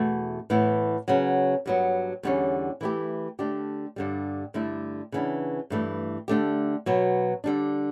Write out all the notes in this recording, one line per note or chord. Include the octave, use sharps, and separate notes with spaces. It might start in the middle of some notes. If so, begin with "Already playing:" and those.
Already playing: E2 B2 A3
A2 E3 B3 E4
C#3 F#3 B3
G2 F#3 B3
E2 D3 G3 C#4
E3 A3 C#4 E4 G4
D3 A3 D4 G4
G2 D3 G3
G2 D3 A3 E4
C#3 E3 B3 D4
G2 E3 A3
D3 A3 D4 G4
B2 F#3 B3
D3 G3 D4